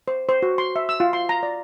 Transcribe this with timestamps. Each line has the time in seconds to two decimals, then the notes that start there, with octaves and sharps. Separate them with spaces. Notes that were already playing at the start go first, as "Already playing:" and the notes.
0.08 C5
0.29 C5
0.42 F#4
0.58 C6
0.76 E5
0.89 E6
1.00 F4
1.13 C6
1.29 A#5
1.43 D5